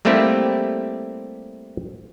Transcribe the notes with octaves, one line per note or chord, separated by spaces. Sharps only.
G3 A3 A#3 C4 E4 G4